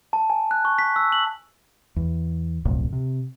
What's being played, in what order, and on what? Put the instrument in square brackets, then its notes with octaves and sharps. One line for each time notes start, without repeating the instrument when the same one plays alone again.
[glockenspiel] A5
G#5
F#6
C#6
B6
E6
F#7
[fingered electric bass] E2
D1 B1 F2 A2
C3